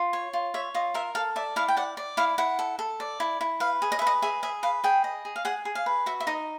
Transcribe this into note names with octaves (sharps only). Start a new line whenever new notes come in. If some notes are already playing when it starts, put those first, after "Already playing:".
Already playing: F4
C#5
F4
C#5 E5
F4 D#5
A#4 E5
A4 F5
D5 E5
E4 F5
G5
D5 F#5
D5
E4 F5
E4 F#5
A4
A4
D5
E4
E4
B4 F5
G#4
D#5
E5
B4
D#5
G#4 E5
G#4 E5
B4 F5
G#4 G5
D#5
G#4
F5
G#4 F#5
G#4
F5
B4
F#4 E5
E5
D#4 D#5